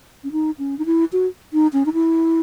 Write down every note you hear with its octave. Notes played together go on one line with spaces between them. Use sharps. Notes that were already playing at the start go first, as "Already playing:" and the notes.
C#4
D#4
C#4
D#4
E4
F#4
D#4
C#4
D#4
E4